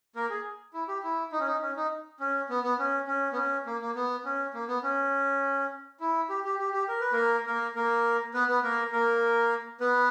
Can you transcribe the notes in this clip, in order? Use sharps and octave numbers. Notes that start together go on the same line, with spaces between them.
A#3 A#4
G#4
E4
G4
E4
D#4
C#4
D#4
C#4
D#4
C#4
B3
B3
C#4
C#4
B3
C#4
A#3
A#3
B3
C#4
A#3
B3
C#4
E4
G4
G4
G4
G4
A#4
B4
A#3 A#4
A#3 A#4
A#3 A#4
B3 B4
B3 B4
A#3 A#4
A#3 A#4
B3 B4